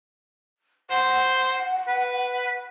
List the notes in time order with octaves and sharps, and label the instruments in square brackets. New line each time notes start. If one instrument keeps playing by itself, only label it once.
[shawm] C5 [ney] F#5
[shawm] B4